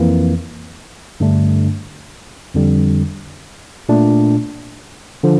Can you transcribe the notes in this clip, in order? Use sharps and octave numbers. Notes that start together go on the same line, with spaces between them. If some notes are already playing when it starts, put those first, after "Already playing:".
Already playing: F2 E3 A#3
G2 D3 A3 D4
F2 D3 G3
A#2 A3 D4
D3 F3